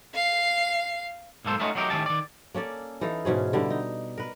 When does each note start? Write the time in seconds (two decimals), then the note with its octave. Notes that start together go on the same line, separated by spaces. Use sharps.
0.14 F5 C7
1.45 B1 G#2 A#3 A4 C5
1.60 A3 B3 C#4 D#4 F4 F#4
1.75 F#3 A3 D#4 G4 A#4
1.90 A2 D#3 A#3 C#4 G4 A5
2.06 D#3 D5
2.55 A#3 C#4 A4 D5
3.01 E3 D#4 A4 F5
3.25 G#2 B2 C#4 G#4
3.53 D3 G3 E4
3.70 D#4
4.18 A#4 B4